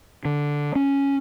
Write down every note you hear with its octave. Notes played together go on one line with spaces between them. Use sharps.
D3
C#4